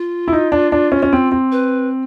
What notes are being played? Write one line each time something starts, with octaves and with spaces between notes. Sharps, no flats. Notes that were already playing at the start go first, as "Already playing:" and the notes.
Already playing: F4
E4
D#4
D4
D4
C#4
C#4
C4
C4
B4